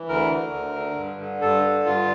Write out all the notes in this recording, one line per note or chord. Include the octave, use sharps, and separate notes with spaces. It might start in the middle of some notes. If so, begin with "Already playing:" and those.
Already playing: E3
D2 A#4
D3
D2
D3
G2
D3
G2 A4
D3
G2 F4